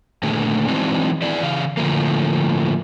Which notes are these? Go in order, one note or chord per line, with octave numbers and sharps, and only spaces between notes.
A#2 D3 D#3 A3 G#4
E3 F#3 G#3 C4 D4 D#4
E4 G#4 D5
C#3 E3 F5
A2 D3 F3 A3 A#3